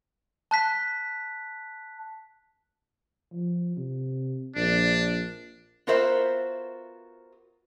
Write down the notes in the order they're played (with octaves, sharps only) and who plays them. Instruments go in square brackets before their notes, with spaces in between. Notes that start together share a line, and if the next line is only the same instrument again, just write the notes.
[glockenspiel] A5 F#6 B6
[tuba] F3
C3
[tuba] A#1 [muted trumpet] D4
[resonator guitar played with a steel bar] B3 F4 F#4 A#4 C5 E5